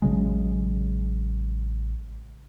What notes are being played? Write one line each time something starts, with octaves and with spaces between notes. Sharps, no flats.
A1 C#3 F#3 G#3